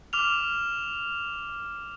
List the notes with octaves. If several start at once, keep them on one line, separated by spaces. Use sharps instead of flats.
D6 F6 F7